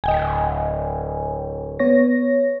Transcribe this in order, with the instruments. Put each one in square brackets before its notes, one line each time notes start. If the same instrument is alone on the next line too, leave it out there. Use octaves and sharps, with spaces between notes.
[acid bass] D1 [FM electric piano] D#5 G5 G#5
[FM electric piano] B3 C#5 A#6